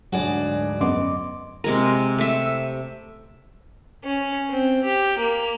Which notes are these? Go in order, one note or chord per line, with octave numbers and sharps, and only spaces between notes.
D2 G#2 F#3 D4 F#4 G#4 D5
F#2 B3 D#5 C6 D6
C3 G#3 A#4
A3 E5
C#4
C4
G4
A#3